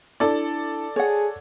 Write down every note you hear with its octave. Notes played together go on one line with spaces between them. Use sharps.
D4 E4 A4 D5
G#4 C#5 F#5